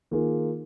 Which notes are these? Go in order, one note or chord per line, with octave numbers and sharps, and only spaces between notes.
D#3 A#3 F4 G#4